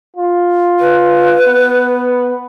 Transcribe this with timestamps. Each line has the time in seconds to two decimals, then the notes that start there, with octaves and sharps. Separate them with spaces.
0.17 F4
0.80 B4
1.47 B3